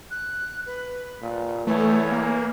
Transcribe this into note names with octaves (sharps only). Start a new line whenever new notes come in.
F#6
B4
A#2
E3 A3 C#5
A#3